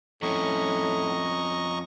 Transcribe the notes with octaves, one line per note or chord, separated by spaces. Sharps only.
F2 A2 C#4 D#5 A#5 C#6